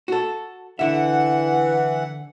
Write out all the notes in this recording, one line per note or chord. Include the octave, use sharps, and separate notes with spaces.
F#4 A4
D3 E3 E5 F#5